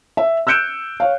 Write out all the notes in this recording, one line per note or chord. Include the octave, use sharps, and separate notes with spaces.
E5
E6 F#6 G6 C#7 D7 E7
C#5 F5